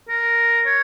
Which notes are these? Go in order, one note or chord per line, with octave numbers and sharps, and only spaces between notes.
A#4
C#5